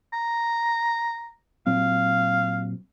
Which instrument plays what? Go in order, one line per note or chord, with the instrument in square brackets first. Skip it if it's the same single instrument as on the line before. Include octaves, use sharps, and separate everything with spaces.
[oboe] A#5
[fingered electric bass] A#2 F#3 C4 [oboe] F5